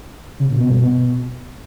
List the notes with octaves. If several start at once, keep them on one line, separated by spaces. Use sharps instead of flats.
C#3
A#2
B2
G2
B2